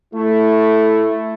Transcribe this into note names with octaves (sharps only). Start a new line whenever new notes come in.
A3 E4